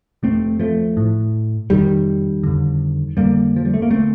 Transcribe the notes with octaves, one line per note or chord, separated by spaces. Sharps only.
F2 C3 A3 C4
F3 A3
A2
F2 C3 D#3 G3
F2 D3
F2 D3 G3 A#3
F3
G3
A3
A#3
D3 A3 C4